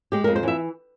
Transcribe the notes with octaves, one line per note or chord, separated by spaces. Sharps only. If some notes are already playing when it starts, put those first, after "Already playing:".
G#3 G4
A#4
F2
C5
E3 E5